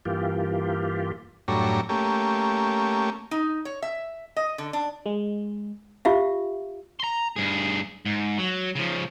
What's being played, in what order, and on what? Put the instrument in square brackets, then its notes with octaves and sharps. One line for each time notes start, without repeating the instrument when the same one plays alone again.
[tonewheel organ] G2 E3 A#3 F4 G4
[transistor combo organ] F#2 A2 G3 D4 C#5 A#5
A3 A#3 C#4 G4
[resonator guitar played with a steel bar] D#4
C#5
E5
D#5
D3
D4
[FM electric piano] G#3
[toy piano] F4 G4 E5 F5
[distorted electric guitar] A#5 C6
G2 G#4
G#2
F#3
C#3 F3